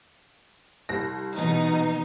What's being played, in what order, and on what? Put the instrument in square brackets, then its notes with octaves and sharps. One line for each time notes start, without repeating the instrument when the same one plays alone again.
[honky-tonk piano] C2 A#6
[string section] B2 D#4 [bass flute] E3